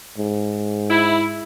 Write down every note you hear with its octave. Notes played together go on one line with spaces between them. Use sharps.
G#2
E4